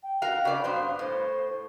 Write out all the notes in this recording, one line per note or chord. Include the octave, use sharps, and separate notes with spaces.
G5
F#4 A#4 F5
C#3 D5 F5
G2 B3 C5
A2 C5